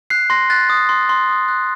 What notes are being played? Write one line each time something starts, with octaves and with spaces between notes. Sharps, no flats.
F#6 C7
C6 A#6
F#6 A6
D#6
C6
C6
D#6
F#6